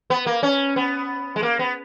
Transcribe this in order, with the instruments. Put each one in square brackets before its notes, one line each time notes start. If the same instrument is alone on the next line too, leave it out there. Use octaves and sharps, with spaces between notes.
[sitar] B3
A#3
C#4
B3
G#3
A#3
B3